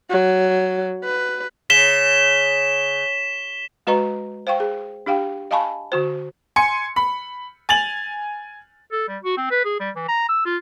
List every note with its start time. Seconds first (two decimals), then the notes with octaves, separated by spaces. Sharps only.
0.10 F#3
1.05 B4
1.70 C#3 B6 E7 G7
3.87 G#3 F#4 B4 D#5 A#5 C#6
4.47 C5 F5 G5 C#6
4.60 G#4
5.06 D4 G4 F5 G5
5.51 D#5 F5 G#5 A5 B5 C#6
5.92 D3 F#4 C5
6.56 G#5 C6 C#7
6.96 B5
7.69 G#5 A6 F7 F#7
8.92 A4
9.08 G3
9.23 F#4
9.37 C4
9.51 B4
9.65 G#4
9.80 G3
9.96 E3
10.09 A#5
10.29 E6
10.46 F4